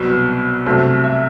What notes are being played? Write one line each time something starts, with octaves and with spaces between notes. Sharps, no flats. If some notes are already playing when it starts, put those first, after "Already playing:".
Already playing: C2 B2 F#3
C2 C3 F#3 A3
E5